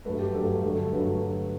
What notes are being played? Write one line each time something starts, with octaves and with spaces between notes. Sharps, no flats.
G2 F#3 A3 B4
G4
G2 F#3 A3 A4
G2 D3 F#3 A3
G2 D3 F#3 A3 B4